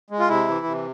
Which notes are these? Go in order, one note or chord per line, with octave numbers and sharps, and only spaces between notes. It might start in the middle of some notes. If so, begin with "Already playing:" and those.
G#3
F4
C3 E4
E3
C3